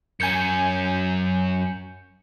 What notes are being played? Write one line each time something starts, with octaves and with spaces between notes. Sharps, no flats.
F#2 C#4 G#5 G6 C#7